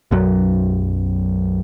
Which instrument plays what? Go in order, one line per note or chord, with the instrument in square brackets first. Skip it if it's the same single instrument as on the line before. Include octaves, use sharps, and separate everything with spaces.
[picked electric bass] B1 F#2 F#3